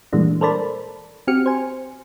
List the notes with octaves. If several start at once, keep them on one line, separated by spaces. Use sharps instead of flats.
A#2 E3 G3 G#3 A#3 D4
A4 A#4 C5 D5 A5 B5
C4 F#4 G4 F6 C#7
C5 G#5